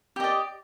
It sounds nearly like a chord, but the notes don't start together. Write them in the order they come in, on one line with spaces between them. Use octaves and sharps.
G4 D#5 D5